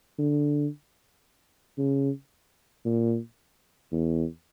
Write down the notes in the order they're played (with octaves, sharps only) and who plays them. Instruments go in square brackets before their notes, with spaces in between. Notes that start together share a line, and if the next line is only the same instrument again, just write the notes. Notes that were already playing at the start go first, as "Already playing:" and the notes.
[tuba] D3
C#3
A#2
E2